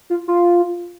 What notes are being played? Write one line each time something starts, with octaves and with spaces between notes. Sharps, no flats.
F4
F4